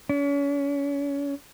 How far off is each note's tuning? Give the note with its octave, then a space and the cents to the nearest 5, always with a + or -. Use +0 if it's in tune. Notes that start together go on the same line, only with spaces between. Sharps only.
C#4 +35